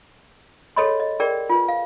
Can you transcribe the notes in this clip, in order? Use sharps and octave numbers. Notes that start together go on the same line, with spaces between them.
G#4 A4 C#5 D#5 B5 C6
D#5
G#4 A#4 D5 G5
F4 B4
F5